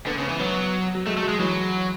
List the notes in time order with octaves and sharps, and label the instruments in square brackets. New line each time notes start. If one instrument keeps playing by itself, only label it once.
[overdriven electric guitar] D3 [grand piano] B3
[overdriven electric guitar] C#3
[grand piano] B3
[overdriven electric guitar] E3
[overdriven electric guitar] F#3 [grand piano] B3
[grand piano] F#3
[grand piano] G#3 [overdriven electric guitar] A3
[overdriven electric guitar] A3
[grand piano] F#3
[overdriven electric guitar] G#3
[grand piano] E3 [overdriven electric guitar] F#3